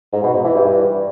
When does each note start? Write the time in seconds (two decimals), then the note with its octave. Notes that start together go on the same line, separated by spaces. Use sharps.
0.13 G#2
0.23 B2
0.34 G#2
0.44 E3
0.54 G2